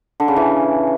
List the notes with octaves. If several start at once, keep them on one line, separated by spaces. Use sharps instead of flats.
D3
C#3
E3